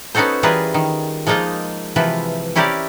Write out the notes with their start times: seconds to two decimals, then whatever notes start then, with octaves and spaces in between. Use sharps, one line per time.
0.15 B3 C#4 D#4 F#4 A4 C5
0.43 E3 G3 F4 G#4 A#4 B4
0.74 D#3
1.27 F3 G#3 A#3 D#4 F4 D#5
1.96 C3 E3 F3 F4 B4
2.56 C#4 E4 G4 A#4 C5 D5